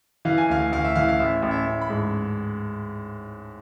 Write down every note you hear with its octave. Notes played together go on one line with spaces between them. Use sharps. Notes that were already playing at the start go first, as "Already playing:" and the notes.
E3 F5
G#5
D2 F5
D2 F5
E5
E3 F5
F5
A1 E5
A1
E5
A1
B5
G#2